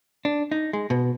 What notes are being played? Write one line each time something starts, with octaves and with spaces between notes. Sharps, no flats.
D4
D#4
G#3
B2